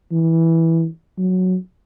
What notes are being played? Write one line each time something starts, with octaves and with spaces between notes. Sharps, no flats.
E3
F#3